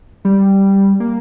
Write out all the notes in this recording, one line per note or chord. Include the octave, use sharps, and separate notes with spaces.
G3
A#3